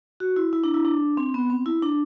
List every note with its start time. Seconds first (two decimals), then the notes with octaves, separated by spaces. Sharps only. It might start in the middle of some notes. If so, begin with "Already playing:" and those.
0.20 F#4
0.36 E4
0.53 E4
0.64 D4
0.74 E4
0.85 D4
1.17 C4
1.34 B3
1.50 C4
1.66 E4
1.82 D4